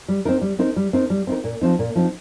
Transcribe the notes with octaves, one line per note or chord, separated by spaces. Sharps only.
G3
C4 D#4 A#4
G3
C4 D#4 A#4
G3
C4 D#4 A#4
G3
C4 D#4 A#4
A#2
F3 C4 D#4
A#2
F3 C4 D#4